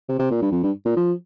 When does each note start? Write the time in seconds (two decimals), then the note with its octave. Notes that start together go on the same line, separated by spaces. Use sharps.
0.09 C3
0.19 C3
0.30 A#2
0.42 G2
0.52 F2
0.63 G2
0.85 A#2
0.97 F3